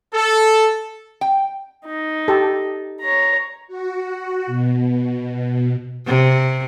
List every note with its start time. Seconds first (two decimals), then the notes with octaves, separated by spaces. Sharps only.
0.14 A4
1.21 G5
1.86 D#4
2.28 G4 A4
3.01 C#5 A#5
3.68 F#4
4.47 B2
6.06 C3